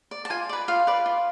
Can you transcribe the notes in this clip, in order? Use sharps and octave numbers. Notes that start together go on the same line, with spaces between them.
D5
A5
F4 G#5
B4 D5
F4 F5
B4 D5
F4